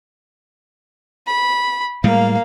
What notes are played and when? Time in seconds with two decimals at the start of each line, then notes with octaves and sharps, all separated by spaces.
1.27 B5
2.04 A2 G3 G#3 A#3 F5